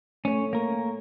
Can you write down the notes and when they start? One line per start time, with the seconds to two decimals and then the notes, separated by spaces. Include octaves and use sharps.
0.25 A3 C#4 C#5
0.53 A#3 A#4